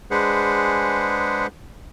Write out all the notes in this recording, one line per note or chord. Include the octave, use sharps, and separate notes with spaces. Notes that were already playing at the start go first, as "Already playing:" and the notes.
G#3 D4 G#4 B4 C5 F#5